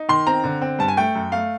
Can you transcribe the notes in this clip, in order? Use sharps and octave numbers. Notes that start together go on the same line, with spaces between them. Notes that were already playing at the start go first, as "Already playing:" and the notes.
Already playing: D#4
D#3 C6
C4 A#5
D3
C4
G2 A5
G#5
A3 G5
F#2
A3 F5